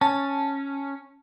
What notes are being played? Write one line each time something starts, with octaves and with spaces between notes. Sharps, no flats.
C#4 A5